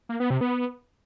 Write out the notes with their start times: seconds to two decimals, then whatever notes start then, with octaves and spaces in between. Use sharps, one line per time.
0.09 A#3
0.20 B3
0.30 C3
0.41 B3